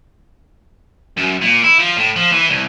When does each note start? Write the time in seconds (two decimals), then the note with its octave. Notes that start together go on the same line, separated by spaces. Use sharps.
1.17 F#2
1.41 A#2
1.63 E4
1.78 F3
1.96 A2
2.16 F3
2.32 E3
2.50 C2